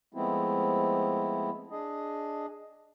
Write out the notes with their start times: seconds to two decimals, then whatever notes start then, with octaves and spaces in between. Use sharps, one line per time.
0.14 F3 G#3 A3 B3 C4 E4
1.71 D4 G#4 D#5